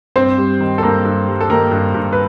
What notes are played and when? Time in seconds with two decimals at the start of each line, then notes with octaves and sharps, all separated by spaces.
0.16 G2 C4 C5
0.38 G3
0.60 D#3
0.78 A4
0.83 G2 A#3 A#4
1.05 G2
1.28 G3
1.41 A4
1.50 D#3 A#3 A#4
1.72 G2
1.94 G2
2.13 B4